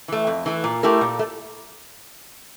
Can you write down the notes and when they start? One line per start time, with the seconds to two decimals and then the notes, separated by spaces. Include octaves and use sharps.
0.08 E3 A3
0.27 F2
0.46 E3 A3
0.64 A#2
0.83 A3 E4 G4 A#4
1.01 A#2
1.19 A3